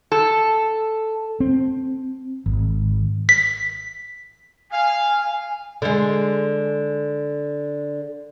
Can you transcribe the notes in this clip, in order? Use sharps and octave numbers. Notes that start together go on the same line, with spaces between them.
A4
C4
G#1
B6
F5 G#5
D3 G#3